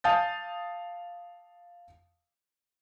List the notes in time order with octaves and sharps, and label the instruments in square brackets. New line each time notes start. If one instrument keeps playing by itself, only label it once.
[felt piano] F5 A5 D#6 G6 A6